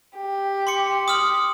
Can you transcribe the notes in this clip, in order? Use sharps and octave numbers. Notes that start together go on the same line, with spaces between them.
G4
C6 D6 C#7
D#6 F6 F#7